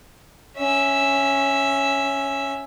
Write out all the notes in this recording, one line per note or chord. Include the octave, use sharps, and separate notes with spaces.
C#4 E5